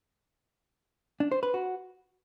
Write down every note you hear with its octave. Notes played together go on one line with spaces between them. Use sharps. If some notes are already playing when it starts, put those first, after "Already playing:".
D4
C5
B4
F#4